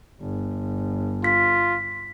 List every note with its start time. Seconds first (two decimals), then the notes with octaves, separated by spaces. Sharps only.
0.21 G1
1.24 F4 B6